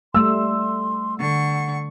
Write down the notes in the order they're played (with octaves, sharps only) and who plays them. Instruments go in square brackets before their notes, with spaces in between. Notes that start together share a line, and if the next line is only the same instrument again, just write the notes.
[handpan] G3 A3 [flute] C6 [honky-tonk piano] E6
[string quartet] D3 C#6 [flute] F#5